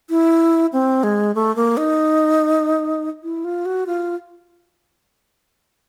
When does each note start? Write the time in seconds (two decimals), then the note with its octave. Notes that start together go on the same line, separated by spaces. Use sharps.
0.10 E4
0.73 C4
1.03 G#3
1.35 A3
1.56 A#3
1.77 D#4
3.24 E4
3.44 F4
3.65 F#4
3.87 F4